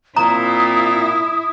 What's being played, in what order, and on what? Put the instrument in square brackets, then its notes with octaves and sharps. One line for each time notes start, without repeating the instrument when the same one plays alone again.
[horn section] A#2 C4 F4 [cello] E4 [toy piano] A#5 [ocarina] D#6